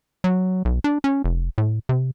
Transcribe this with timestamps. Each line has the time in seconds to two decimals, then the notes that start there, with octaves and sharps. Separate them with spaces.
0.24 F#3
0.65 B1
0.84 D4
1.04 C#4
1.24 F1
1.58 A2
1.89 C3